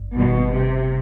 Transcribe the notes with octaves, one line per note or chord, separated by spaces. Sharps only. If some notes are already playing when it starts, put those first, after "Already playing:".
Already playing: G1 G2
G1 G2 B2 D#3 G3
C3